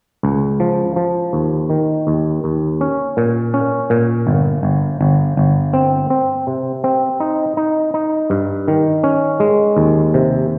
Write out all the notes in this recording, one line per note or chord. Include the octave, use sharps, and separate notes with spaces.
C#2
F3
F3
D#2
D#3
D#2
D#2
C#4
A#2
C#4
A#2
G1
G1
G1
G1
C4
C4
C3
C4
D#4
D#4
D#4
G2
D#3
C#4
G#3
D#2
C3